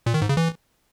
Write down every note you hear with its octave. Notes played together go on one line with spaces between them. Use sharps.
A#2
D#3
G#2
C#3
E3